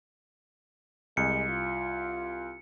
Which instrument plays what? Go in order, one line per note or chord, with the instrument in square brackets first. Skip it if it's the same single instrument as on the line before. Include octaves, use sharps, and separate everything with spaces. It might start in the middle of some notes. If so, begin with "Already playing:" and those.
[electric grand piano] C2 [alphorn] G#3 [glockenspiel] C#7
[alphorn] F4